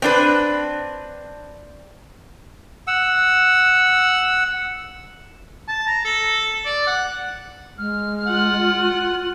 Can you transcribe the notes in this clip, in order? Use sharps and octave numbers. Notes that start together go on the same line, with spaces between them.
C4 D4 B4
F#5 E6
A5
A#5
A4
D5
F#5
G#3 F6
F4 F#5